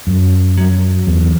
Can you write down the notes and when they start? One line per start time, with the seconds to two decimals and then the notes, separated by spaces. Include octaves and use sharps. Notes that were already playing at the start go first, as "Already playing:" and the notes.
0.07 F#2
0.57 F#3
1.07 E2